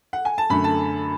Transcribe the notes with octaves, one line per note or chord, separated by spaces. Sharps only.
F#5
G#5
A5
F#2 D3 A3 B5
A5